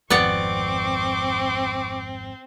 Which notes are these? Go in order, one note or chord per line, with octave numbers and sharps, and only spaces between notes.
G#1 F2 B3 C4 D5 F#5 C#6 D6